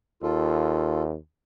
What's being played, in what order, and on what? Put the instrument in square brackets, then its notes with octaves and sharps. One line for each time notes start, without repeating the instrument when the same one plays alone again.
[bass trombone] D#2 [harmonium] F4 A4